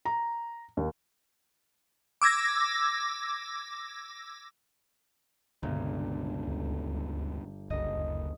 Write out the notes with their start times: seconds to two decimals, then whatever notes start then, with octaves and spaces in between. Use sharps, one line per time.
0.05 A#5
0.77 D#2
2.22 D6 E6 G#6 A#6
5.63 G1 C#2 B2
6.48 D2
7.70 F#1 C2 D#5
7.95 D2